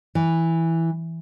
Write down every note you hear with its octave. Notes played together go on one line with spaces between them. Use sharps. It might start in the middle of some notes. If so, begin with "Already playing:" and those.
E3